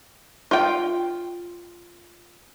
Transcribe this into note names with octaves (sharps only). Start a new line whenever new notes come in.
F4 G5